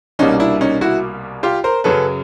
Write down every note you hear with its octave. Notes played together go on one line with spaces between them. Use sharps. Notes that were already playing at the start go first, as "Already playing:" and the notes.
C2 B2 G3 A#3 C#4 D#4
D4 E4
C#4 D#4
E4 F#4
F4 G4
A#4 C5
F#2 C#3 F#3 A4 B4